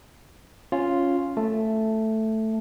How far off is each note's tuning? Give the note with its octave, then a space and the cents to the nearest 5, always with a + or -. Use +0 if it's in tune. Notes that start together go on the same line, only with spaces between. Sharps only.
C#4 +0 F4 +0
A3 +0 A5 +0